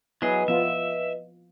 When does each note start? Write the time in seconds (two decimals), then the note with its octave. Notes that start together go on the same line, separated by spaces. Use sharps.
0.22 F#3 B3 E4 G#4 B4 D#5
0.48 F3 B3 F4 E5